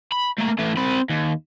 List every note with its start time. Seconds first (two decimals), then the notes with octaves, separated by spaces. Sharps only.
0.12 B5
0.39 A3 A#3
0.59 E3 A3
0.77 C4 B5
1.09 D#2